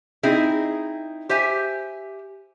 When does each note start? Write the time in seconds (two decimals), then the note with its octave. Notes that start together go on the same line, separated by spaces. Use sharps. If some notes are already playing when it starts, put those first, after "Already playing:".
0.23 C4 D#4 E4 G#4
1.29 G4 C5 E5 G#5